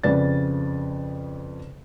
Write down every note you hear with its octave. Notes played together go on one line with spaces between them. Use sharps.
F2 C#3 B4 D5 A6